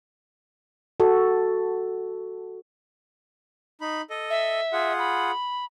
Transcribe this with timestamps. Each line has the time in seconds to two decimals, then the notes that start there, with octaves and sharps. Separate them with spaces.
1.00 F#4 A4
3.81 D#4 B5
4.10 A4 D#5
4.30 E5
4.73 F4 G#4 F#5
4.99 B5